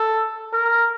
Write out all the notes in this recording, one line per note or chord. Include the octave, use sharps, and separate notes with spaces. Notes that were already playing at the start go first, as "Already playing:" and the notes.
Already playing: A4
A#4